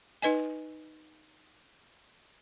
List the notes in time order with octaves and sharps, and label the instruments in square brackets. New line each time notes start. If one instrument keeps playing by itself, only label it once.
[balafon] D#4 B4 D#5 G#5